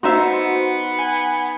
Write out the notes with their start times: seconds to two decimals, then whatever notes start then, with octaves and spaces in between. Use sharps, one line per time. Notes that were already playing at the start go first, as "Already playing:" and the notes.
0.03 B3 D#4 F#4 C5 D#5 E5 A#5 C6
0.99 G#5